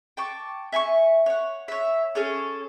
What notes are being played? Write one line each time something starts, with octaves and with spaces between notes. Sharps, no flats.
G5 A5 C#6 D6
E5 G#5 C6 C#6
C#5 F#5
C#5 E5
C#4 G#4 A4 C#5